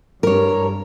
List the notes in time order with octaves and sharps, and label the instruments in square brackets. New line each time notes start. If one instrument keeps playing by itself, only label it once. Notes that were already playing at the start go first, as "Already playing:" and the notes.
[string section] G2 [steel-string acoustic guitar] A#4 C#5